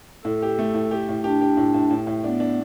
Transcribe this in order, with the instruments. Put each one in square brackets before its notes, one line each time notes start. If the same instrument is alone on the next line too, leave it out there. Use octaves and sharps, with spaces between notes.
[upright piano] A2 [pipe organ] A4
[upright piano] G4
A3
A2
G4
A2
[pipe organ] D4 [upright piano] G4
[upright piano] G4
A2
A2
A2
A2
[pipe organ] B3 [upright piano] D4
[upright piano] D4